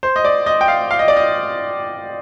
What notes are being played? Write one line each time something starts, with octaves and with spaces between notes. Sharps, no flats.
C5
D#5
D5
D#5
G5
F5
F5
D#5
D5
D#5